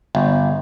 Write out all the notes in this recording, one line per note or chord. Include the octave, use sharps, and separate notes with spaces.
G1